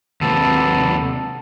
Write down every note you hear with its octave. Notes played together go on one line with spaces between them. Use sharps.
D#2 C3 B3 A4 A5